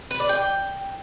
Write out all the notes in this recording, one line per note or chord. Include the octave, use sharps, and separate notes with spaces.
B4
D5
G5